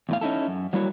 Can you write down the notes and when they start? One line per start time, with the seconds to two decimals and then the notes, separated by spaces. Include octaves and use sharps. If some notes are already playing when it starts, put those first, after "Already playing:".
0.09 E2 A2 F5
0.21 C#4 D#4 E4 A4
0.47 F#2
0.73 F#3 G3 A#3 E4 F#4 C#5